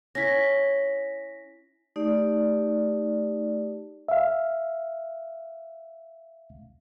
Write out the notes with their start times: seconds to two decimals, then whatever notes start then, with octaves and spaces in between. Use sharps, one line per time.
0.15 C#4 E4 A#6 B6
1.96 A3 D#4 G4 D5
4.08 E5 F5